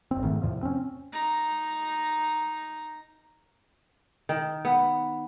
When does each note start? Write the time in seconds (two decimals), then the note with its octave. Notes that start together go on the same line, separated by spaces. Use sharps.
0.11 F#1 C4
0.23 G#2 D#3 A3
0.42 E2 A2 C3 F3
0.63 C4 C#4
1.12 D#4 A#5
4.29 D#3
4.65 B3